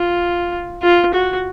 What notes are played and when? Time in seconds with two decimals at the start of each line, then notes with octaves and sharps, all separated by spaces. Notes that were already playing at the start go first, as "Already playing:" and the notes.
Already playing: F4
0.83 F4
1.14 F#4